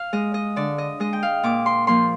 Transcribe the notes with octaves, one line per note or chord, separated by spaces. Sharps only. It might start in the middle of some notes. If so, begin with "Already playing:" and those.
Already playing: F5
G#3 D#5
D#5
D3 D5
D#5
G#3 D#5
G5
F5
A#2 D6
C6
F3 A#3 C6